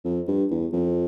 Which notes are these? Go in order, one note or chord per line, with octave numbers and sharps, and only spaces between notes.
F2
G2
E2
F2